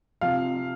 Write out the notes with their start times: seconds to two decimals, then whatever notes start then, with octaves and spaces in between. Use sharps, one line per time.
0.21 C3 F3 F5